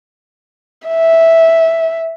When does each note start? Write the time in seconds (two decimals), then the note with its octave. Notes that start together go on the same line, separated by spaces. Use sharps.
0.87 E5